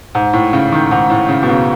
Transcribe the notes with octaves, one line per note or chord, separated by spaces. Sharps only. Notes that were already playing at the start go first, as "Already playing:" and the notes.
G#2
A2
C#3
D#3
G#2
A2
C#3
B2
C#3